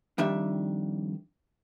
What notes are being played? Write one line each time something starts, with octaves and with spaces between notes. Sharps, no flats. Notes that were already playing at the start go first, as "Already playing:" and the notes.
F2 D#3 G3 D4 E5